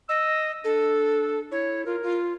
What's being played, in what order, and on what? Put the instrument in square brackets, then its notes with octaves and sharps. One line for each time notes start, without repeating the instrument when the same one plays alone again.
[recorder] D#5 [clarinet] E6
[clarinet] D4 [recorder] A4
[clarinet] E4 [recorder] C#5
[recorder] F4 [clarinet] A#4
[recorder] F4